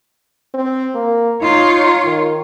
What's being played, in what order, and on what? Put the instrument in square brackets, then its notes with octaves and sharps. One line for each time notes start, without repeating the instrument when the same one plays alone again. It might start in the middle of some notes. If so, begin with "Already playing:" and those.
[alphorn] C4
A#3
[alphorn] D#4 [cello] F4 C#5
[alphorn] D#3